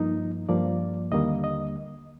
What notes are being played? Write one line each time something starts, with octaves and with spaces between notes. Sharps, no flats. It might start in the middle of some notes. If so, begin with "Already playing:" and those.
Already playing: G2 F3 A#3 D#4
G2 F3 A#3 D5
D#2 D3 G3 A#3 D#5
D#5